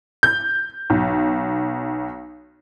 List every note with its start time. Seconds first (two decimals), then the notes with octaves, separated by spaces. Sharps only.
0.23 G6
0.90 B1